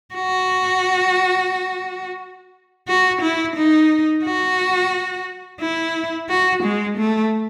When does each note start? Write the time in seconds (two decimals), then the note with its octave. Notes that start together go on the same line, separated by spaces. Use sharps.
0.14 F#4
2.88 F#4
3.21 E4
3.56 D#4
4.24 F#4
5.61 E4
6.29 F#4
6.63 G#3
6.98 A3